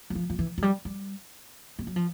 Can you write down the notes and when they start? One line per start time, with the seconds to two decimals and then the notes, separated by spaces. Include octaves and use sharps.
0.10 F#3
0.15 F3
0.30 F3
0.39 E3
0.58 F#3
0.62 G3
0.85 G3
1.79 G3
1.87 F#3
1.96 F3